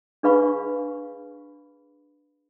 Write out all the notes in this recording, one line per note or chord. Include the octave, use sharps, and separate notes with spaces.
D4 G#4 B4 F5 B5 C#6